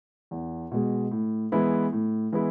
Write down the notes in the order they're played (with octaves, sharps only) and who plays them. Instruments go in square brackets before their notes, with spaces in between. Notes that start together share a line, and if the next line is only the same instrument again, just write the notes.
[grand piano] E2
B2 G#3
A2
E3 G#3 B3 E4
A2
E3 G#3 B3 E4